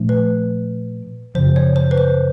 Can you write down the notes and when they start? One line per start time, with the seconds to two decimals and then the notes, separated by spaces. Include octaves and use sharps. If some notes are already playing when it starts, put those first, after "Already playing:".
Already playing: A#2 F3 A3 D4
0.09 B4
1.35 F#2 C#3 F3 C5
1.56 C#5
1.76 C5
1.91 B4
1.98 C5